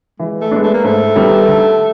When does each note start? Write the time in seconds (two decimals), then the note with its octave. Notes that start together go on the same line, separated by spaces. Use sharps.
0.19 E3 G#3
0.41 A3
0.51 G#3 B3 D4
0.63 A3
0.74 A#3
0.84 G#2 A3
1.16 D#3 G3 B3
1.47 D3